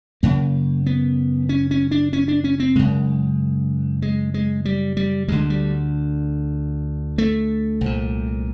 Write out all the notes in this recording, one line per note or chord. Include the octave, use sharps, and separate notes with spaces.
F#2 C#3 A#3
B3
C#4
C#4
D4
C#4
D4
C#4
C4
F#2 C#3 G#3
G#3
G#3
G3
G3
D2 D3 G#3
G3
A3
C2 A#2